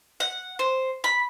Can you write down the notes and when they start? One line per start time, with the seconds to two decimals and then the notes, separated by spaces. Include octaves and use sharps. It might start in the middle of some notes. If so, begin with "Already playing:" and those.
0.20 F#5
0.59 C5
1.04 B5